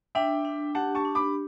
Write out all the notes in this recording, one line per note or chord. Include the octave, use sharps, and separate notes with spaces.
D4 E5 G5
D4
G4 F#5 A5
A5 C#6
D4
B5 D6